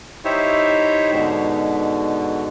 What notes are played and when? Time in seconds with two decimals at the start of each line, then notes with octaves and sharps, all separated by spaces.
0.25 D#4 E4 G4 C5 C#5 E5
1.12 G#2 B2 D3